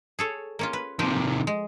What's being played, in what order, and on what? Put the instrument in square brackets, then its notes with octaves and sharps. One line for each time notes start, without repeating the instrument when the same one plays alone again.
[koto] G#4 A4 C#5
A#3 C#4 F4
B4
[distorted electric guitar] C3 D#3 [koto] F3 G4
[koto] G#3